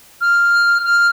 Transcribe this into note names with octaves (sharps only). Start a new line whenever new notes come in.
F6
F6